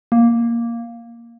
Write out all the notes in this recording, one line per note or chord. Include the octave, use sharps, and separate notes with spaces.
A#3